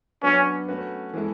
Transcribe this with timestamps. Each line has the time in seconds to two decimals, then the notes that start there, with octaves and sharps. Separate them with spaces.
0.23 F#3 B3 C#4 D4 F#4
0.68 A3 C#4 F#4 B4
1.14 E3 G#3 B3 E4 A4